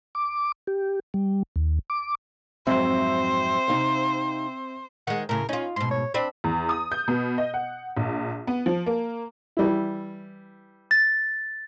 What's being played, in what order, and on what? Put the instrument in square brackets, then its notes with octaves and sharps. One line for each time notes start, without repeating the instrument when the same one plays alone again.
[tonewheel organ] D6
G4
G3
D#2
D6
[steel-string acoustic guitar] F2 G#2 F#3 [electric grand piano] C4 E5 [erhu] C5
[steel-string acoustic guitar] C3 D#4 F5
[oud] D#3 G#3 [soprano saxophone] F#5
[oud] A2 C#3 [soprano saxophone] A#4
[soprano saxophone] C#4 [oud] D#4 F4
[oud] G#2 B2 [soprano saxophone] C6
[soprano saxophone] C#5
[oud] C4 D4 [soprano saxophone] B5
[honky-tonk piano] E2
D#6
G6
B2
D#5
F#5
A#1
B3
F3
A#3
[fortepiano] E3 G3 E4
[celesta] A6